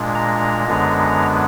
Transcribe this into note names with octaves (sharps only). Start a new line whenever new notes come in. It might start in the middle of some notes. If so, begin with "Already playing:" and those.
Already playing: A#2 G#3 D4
A#5
F#2 D3 G#3 B3 D4